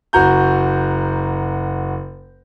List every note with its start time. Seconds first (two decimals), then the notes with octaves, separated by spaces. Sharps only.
0.13 F#1 F#4 A#5 G6